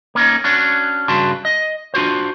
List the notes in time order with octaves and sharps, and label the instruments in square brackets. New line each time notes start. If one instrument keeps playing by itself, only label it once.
[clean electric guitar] A#3 C#4 D#4
C#4 D4 F#4
G2 C#3 F#4 A5 C6
D#5
D4 F4 F#4 C5